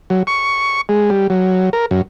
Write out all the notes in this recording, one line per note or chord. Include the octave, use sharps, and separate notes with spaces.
F#3
C#6
G#3
G3
F#3
A#4
F#2